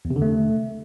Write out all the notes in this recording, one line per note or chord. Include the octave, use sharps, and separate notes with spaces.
E2
C3
D3
A3